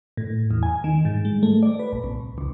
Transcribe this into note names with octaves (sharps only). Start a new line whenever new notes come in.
A2
E2
G#5
D#3
G#2
G#3
A3
D5
B4
A#1
C2
C#2